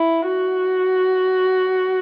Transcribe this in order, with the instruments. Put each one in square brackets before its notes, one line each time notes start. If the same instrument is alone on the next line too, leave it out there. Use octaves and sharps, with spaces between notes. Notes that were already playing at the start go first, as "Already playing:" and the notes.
Already playing: [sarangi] E4
F#4